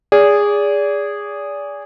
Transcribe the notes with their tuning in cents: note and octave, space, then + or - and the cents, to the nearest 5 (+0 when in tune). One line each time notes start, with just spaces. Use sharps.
G#4 -15 D5 -30